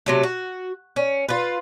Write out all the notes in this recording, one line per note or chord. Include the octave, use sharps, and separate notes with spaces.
C3 F#3 A3
F#4
C#4
F4 B4